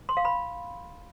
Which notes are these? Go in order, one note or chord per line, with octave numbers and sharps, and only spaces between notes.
C6
F5
B5